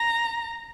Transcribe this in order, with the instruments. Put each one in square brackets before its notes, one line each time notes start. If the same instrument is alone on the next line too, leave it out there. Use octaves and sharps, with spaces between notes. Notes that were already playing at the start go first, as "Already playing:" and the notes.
Already playing: [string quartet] A#5